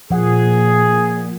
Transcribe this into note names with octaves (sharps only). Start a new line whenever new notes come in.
A#2 F3 G#4 F#5